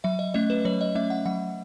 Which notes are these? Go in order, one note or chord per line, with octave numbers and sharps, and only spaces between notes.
F#3 E5
D#5
A3 C#4 D#5
B4
F#3 C#5
D#5
A3 C#4 E5
F#5
F#3 F#5